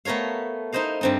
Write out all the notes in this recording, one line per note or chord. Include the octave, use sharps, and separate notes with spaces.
A3 B3 A#4 C#5 F5
D#4 E4 C5 D#5 F5
G2 C4 D#4